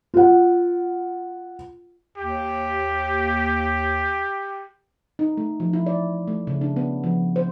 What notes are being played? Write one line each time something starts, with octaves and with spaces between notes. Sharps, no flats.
F4 F#5
D#2 G4
D#4
A3
F3
E4
D5
A3
C#3
D4
B3
F3
C5